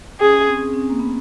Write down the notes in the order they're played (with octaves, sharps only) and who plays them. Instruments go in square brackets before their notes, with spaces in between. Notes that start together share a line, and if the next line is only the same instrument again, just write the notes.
[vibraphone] C#4 [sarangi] G#4
[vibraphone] C4
C4
A#3
B3